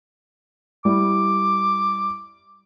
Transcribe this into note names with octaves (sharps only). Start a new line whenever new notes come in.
G3 E4 D6